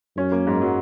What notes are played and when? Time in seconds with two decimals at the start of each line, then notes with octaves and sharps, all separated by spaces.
0.17 F#2 C#4
0.32 A#3
0.47 G#2
0.62 F#3